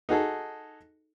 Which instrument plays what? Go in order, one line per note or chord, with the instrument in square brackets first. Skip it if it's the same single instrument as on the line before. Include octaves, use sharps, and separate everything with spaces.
[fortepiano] D#4 F#4 G#4 A4